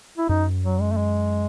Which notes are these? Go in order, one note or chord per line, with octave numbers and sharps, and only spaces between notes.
E4
F#2 D#4
F#3
G#3
A3
G#3